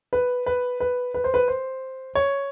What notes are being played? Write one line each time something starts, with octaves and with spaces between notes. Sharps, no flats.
B4
B4
B4
B4
C5
B4
C5
C#5